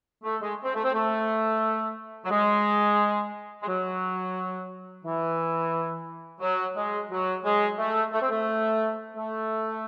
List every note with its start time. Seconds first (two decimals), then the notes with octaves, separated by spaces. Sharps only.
0.24 A3
0.41 G#3
0.64 C4
0.75 A3
0.84 C4
0.93 A3
2.25 F#3
2.30 G#3
3.63 G#3
3.67 F#3
5.04 E3
6.41 F#3
6.76 G#3
7.11 F#3
7.44 G#3
7.79 A3
8.13 A3
8.22 C4
8.30 A3
9.16 A3